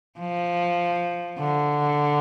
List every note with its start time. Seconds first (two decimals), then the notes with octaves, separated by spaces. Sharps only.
0.19 F3
1.39 D3